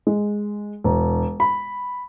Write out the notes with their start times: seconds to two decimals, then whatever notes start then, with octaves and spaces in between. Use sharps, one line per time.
0.07 G#3
0.84 E1
1.40 B5